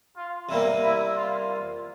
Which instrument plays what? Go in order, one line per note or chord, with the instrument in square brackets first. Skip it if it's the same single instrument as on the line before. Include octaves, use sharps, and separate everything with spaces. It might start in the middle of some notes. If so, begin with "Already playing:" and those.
[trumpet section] F4
[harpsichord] C3 G3 A#3 [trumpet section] E4
[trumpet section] E4
F4
F4